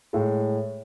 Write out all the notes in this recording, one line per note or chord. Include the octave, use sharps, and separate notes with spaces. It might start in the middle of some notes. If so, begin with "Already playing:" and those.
A2 G#3